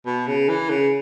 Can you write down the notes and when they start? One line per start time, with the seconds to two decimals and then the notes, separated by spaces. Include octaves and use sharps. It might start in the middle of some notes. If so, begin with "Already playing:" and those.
0.06 B2
0.27 C#3
0.49 E3
0.70 C#3